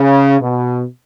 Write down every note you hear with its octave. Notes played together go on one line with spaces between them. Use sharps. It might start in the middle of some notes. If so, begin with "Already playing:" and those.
Already playing: C#3
B2